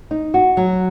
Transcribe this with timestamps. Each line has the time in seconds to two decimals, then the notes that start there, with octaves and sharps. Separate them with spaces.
0.11 D#4
0.34 F#4
0.57 F#3